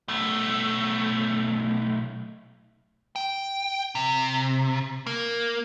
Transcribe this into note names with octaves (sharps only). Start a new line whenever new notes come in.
B1 A3
G5
C3
A#3